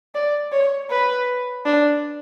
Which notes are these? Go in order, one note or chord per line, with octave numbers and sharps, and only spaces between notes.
D5
C#5
B4
D4